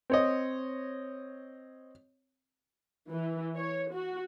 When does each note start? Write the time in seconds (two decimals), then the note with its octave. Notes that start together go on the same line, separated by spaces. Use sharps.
0.10 C4 C#5 D#5
3.12 E3
3.57 C#5
3.92 F#4